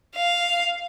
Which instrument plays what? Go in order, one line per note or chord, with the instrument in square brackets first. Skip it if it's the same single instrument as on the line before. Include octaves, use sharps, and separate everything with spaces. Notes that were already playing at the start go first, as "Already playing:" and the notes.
[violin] F5